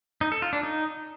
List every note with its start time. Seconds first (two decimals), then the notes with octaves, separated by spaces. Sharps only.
0.21 D#4
0.32 A4
0.42 F4
0.53 D4
0.63 D#4